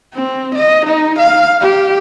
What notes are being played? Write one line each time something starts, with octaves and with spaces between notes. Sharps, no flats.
C4
D#5
D#4
F5
G4